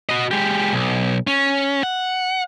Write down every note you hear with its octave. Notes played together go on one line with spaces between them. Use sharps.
F#4 D#5
G#3 G4
B1
C#4
F#5